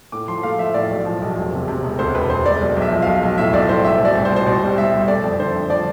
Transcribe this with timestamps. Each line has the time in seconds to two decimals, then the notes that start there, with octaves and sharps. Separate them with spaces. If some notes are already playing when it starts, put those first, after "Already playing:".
0.12 A2 D6
0.28 F3 C6
0.43 A3 F5
0.59 F3 E5
0.74 A2 D5
0.91 B1
1.05 F3
1.22 B1
1.37 E1
1.52 C3
1.68 C3
1.83 E1
1.99 D2 C5
2.14 E1 B4
2.30 E1 C5
2.45 E1 D5
2.60 B1
2.76 B1
2.82 E5
2.92 F3
3.02 B1 F5
3.23 B1
3.37 A2 E5
3.53 B1 D5
3.69 A2 C5
3.84 C2 E5
4.00 B2
4.05 D5
4.15 C2
4.25 C5
4.30 B2
4.36 C5
4.46 B2 D5
4.62 G3
4.78 C2 E5
4.93 C2
5.08 A3 D5
5.23 F2
5.39 D3 C5
5.54 F2
5.70 F3 D5